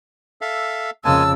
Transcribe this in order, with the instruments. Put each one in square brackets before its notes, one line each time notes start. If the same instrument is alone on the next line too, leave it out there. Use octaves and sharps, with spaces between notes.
[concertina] A4 E5 F5
[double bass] F2 C#3 [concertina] G#3 A#3 G#5 [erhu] A5 [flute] E6